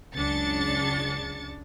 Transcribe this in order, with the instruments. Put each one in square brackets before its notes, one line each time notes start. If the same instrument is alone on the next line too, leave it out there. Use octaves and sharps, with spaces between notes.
[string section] C#2 F#2 C#3 D4 A6 C#7